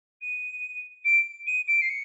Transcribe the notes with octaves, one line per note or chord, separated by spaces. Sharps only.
D#7
D7
D#7
D7
C7
C#7